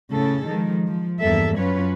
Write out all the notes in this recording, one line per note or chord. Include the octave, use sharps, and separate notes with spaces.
A2 C#3 G#4 A4
D#3 F3 G#3
F3
E2 G2 A#3 A4 E5
F#2 F#3 C#4 F4 B4 C#5